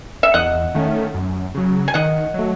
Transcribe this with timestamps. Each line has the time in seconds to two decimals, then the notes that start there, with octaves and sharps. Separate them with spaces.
0.23 E5
0.34 E2 D#5 F#5
0.75 D#3 A3 C#4
1.14 F#2
1.55 C#3 F#3
1.88 G#5
1.94 D#3 D#5 F#5
2.34 F#3 A3